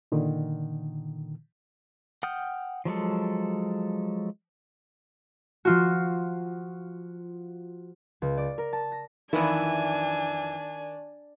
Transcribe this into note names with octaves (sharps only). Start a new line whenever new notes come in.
A#2 D3 D#3
F#5 G5 D#6 F6 G6
F3 F#3 G#3 A4
F3 F4 F#4
C#2
D5
A#4
A5
A#6
F2 D#3 E3 D4 E4 G#5